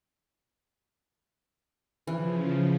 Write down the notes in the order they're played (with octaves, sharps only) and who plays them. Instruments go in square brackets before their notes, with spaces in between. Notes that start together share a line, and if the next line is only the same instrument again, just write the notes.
[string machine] C#3 F3 [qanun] E3